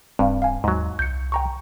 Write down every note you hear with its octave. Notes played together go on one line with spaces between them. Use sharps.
D1 G2 C4 F5
F5 G#5
D#2 G#2 F#3
C2 G6 C#7
G5 A#5 C#6